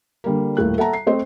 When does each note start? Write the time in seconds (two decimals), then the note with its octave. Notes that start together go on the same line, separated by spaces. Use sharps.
0.24 D3 G3 A#3
0.57 D#1 A2 A3 A#4 F#6
0.78 A4 E5 F#5 A5 A#5
0.93 C7
1.07 A3 C4 C5 D#5